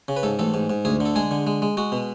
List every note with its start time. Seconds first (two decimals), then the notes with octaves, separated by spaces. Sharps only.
0.08 C#3
0.16 B4
0.23 G#2 A4
0.39 A1 A4
0.54 G#2
0.70 G#2
0.85 D2 G#4
1.00 D3
1.05 A4
1.16 G#3 G#4
1.31 D3
1.47 G#3
1.62 G#3
1.77 G#3 F#4
1.92 B2